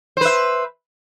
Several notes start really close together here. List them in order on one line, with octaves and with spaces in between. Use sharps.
C5 B4 E5